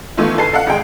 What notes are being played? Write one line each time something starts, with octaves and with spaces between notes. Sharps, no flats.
D#3 E3 A3 B3 E4 F4
F#1 A4 B4 G#5 C7
A4 F5 F#5
G#1 G#3 G#4 G5